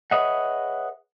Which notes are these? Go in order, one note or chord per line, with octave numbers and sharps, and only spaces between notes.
G#4 B4 C#5 D#5 E5 F#5